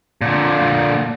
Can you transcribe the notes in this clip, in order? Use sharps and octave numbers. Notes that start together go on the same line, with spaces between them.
A#2 D3